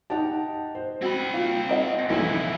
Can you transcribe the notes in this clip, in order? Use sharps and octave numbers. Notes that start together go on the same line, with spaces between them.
D#4 G4 F#5 A5
C5
C4 F#4 B5
A#3 F4
A#4 D#5 F#5
B1 E3 F3 E4